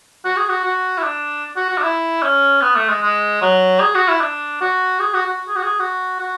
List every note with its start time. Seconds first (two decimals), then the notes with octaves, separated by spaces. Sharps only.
0.25 F#4
0.37 G#4
0.49 F#4
0.64 F#4
0.98 E4
1.04 D4
1.57 F#4
1.70 F#4
1.78 D4
1.84 E4
2.23 C#4
2.62 B3
2.76 A3
2.89 G#3
3.02 G#3
3.42 F#3
3.81 G#4
3.95 F#4
4.08 E4
4.21 D4
4.61 F#4
5.00 G#4
5.14 F#4
5.27 F#4
5.48 G#4
5.56 F#4
5.64 G#4
5.80 F#4
6.20 F#4